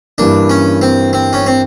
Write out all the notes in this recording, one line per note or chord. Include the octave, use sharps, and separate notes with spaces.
G2 E3 G3 A#3 D4
C#4
C4
C4
C#4
C4